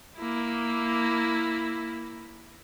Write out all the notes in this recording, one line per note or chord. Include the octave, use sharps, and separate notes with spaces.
A#3 E4